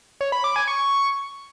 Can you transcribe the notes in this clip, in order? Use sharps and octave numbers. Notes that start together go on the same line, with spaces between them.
C#5
B5
D6
G#5
C#6